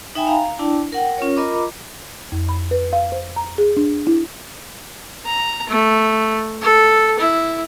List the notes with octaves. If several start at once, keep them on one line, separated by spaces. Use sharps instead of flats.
D#4 E5 G5 G#5 B5
F5 A#5
D4 E4 D5 G5 A5
A#4 F#5 G5
C#4 F4 A#4 C#5
F4 A#4 D#5 A#5 B5 D6
F2
B5
B4
F5
C5
A#5
G#4
D4
E4
A#5
A3
A4
E4